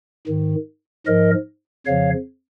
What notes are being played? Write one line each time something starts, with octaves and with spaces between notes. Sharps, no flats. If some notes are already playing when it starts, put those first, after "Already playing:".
G#2 D#3
G#2 F3 A#4 D#5
F2 C#3 F3 C#5 F5